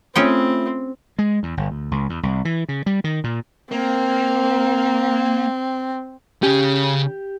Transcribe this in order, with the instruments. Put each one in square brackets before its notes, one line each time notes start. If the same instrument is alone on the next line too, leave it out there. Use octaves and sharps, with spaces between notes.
[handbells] A3 F4 B5 [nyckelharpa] C4 [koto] C#4 G#4 G5
[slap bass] G#3
E2
G1
D2
C#2
E2
C2
E3
C#3
G3
D#3
A#2
[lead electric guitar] A#3 [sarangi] C4
[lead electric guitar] C#3 C#4 [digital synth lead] G4